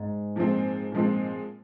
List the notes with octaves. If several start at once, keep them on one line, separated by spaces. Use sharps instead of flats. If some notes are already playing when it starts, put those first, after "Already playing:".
Already playing: G#2
A#2 F3 G#3 C4
A#2 F3 G#3 C4